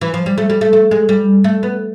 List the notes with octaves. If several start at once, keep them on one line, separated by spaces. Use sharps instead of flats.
E3
F3
G3
A3
G3
A3
A3
G#3
G3
A3
B3